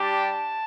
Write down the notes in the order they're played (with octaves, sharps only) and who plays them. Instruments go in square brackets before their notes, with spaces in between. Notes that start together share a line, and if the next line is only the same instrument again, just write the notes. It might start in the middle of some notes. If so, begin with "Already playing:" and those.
Already playing: [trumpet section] G3 D4 G4 A5